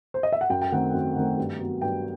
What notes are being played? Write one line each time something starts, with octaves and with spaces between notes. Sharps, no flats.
C5
D#5
E5
F#5
F#2 G5
G5
D#3 A3 C4 F#5
F#2
D#3 A3 C4
G2
F#3 B3
G2 G5